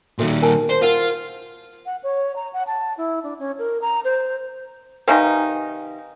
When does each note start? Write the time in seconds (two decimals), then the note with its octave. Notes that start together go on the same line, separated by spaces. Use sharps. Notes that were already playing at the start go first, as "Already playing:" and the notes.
0.19 A#2 D#3 F#4 A4 E5
0.42 A#4 G#5 A5
0.70 C5
0.82 F4 A#4 F#5
1.86 F#5
2.03 C#5
2.36 A#5
2.53 F#5
2.67 A5
2.98 E4
3.24 D4
3.39 C#4
3.59 A#4
3.82 A#5
4.04 C5
5.08 C3 D#3 D#4 B4 F5 G#5